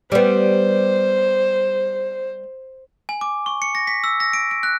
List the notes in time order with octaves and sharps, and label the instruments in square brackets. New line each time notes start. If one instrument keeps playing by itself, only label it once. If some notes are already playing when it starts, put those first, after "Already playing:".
[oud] G3 B3 [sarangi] C5
[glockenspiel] G#5
D6
C#6
C#7
A#6
B6
E6
A#6
D7
D7
F#6